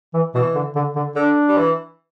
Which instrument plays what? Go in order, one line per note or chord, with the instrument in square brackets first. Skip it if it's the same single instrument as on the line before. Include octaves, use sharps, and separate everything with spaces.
[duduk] E3
[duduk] B2 [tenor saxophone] E3
[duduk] D3
D3
D3
[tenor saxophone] D3 [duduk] D4
[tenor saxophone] G3
E3